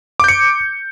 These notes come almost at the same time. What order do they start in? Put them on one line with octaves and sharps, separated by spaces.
D6 G6 C#7